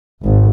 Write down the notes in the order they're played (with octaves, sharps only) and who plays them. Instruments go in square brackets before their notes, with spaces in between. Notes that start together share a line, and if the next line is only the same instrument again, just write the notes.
[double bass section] G#1